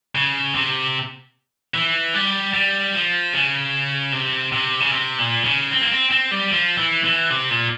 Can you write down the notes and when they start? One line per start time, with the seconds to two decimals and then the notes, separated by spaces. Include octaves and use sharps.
0.15 C#3
0.55 C3
1.74 E3
2.14 G3
2.54 G3
2.94 F3
3.33 C#3
4.12 C3
4.52 C3
4.80 C#3
4.91 C3
5.19 A#2
5.44 C#3
5.71 C4
5.81 A#3
5.91 C4
6.11 C4
6.31 G3
6.51 F3
6.77 E3
7.04 E3
7.30 C3
7.50 A#2